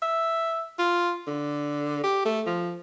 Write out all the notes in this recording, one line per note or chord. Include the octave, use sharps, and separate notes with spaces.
E5
F4
D3
G4
A3
F3